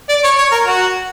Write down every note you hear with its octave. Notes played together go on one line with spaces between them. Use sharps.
D5
C#5
C#5
A#4
F#4